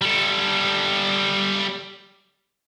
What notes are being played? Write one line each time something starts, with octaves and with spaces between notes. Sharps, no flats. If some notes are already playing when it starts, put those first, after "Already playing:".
G3 A4